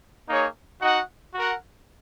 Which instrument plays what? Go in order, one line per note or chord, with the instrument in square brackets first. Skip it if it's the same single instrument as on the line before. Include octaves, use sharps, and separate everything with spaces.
[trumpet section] A#3 D#4 G#4 C#5
D#4 F#4 D#5 F#5
F#4 A#4 F#5